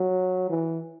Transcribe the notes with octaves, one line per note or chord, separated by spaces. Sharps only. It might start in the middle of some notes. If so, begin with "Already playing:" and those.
Already playing: F#3
E3